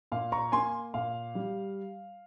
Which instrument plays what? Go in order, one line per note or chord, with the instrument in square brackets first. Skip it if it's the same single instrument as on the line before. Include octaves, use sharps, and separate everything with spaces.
[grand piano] A#2 F5
A#5 C#6
A#3 G#5 C6
A#2 F5
G3